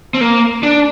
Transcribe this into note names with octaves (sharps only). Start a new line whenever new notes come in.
C4
A#3
D4